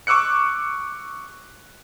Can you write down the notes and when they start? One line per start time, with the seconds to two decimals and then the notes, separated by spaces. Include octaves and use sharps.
0.07 C#6 D6 E6 F#6 C#7